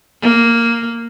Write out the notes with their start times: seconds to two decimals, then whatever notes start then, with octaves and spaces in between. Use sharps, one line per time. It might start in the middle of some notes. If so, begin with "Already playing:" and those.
0.22 A#3